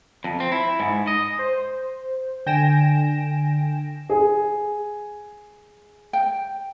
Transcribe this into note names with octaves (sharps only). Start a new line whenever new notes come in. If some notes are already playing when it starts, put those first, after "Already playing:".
F2
C4
E4
G#2
D#5
C5
D3 G5 G#5 A#6 D7 E7
G#4
G5